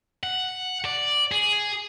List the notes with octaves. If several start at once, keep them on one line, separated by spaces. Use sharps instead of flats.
F#5
D5
G#4